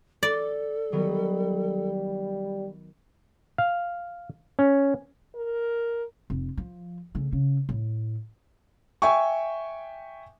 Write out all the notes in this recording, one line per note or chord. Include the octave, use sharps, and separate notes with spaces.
A4 D5
D#3 F#3 G3 B3
F5
C#4
A#4
F1
F3
C#3 A3
C#3
A2
E5 G5 G#5 C#6